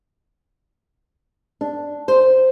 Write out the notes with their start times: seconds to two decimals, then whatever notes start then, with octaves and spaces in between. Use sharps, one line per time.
1.61 D4
2.08 C5